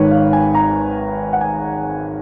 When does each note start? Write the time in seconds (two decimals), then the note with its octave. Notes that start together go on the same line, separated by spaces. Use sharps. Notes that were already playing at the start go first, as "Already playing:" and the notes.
Already playing: G#1 G#2 D#3 B4 C#5
0.11 F5
0.33 G#5
0.55 A#5
1.33 F#5
1.41 G#5